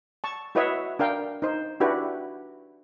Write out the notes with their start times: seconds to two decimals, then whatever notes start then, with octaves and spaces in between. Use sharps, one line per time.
0.24 A5 C#6
0.55 E4 F#4 B4 C#5 D#5 E5
0.99 D4 A#4 F5 G5
1.42 D#4 C5
1.80 D4 E4 F#4 G4 B4